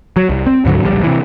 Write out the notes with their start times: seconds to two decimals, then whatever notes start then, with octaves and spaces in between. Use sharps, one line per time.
0.16 F#3
0.29 C2
0.46 C4
0.65 D2 G#2 D3 F#3
0.82 D1 A#1 G3
1.03 C3 E3